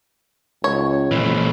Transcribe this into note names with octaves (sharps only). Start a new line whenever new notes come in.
C#2 C#5
F2 A#2 E3